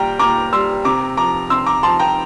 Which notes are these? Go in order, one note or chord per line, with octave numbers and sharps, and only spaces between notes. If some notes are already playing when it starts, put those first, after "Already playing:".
Already playing: A#2 G3 G5 A#5
A#2 A#5 D6
G3 C6 E6
C3 A#5 D6
F3 A#5 D6
C3 C6 E6
A#5 D6
F3 A5 C6
G5 A#5